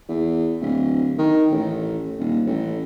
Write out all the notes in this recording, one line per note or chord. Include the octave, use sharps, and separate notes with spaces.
E2
D1
D#3
A1
D#1
A1